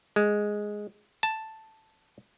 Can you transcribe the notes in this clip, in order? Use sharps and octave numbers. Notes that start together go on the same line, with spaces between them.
G#3
A5